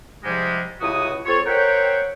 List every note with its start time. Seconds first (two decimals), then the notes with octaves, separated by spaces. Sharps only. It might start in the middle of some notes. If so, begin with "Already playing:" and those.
0.24 G#2 C3 F3 G3 G#3
0.81 C#2 C3 E4 F#4 D#6
1.25 C4 F4 A4 C#5
1.47 A#4 C5 C#5 E5 F#5 G5